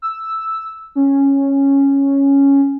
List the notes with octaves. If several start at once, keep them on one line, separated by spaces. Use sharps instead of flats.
E6
C#4